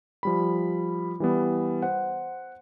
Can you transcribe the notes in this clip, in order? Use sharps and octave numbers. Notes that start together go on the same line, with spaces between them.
F3 G3 B5
E3 G3 B3
C5 F#5